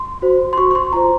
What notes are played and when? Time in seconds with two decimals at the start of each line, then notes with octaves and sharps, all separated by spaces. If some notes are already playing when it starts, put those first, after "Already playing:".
Already playing: C6
0.22 F#4 C5
0.53 C6
0.58 F#4 C5 C#6
0.71 C#6
0.75 C6
0.93 F4 C5 A#5